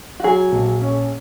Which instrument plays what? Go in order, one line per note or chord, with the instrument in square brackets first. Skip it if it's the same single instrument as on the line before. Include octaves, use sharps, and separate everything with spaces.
[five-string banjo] F#4
[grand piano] F#3 [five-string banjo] G#4
[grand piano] A#1
C#4